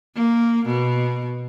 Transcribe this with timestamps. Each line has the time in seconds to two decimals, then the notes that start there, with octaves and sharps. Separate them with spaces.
0.15 A#3
0.66 B2